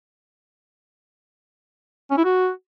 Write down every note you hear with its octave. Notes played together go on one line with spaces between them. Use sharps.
C#4
E4
F#4